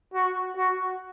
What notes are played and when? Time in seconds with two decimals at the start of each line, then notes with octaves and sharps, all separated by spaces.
0.14 F#4
0.57 F#4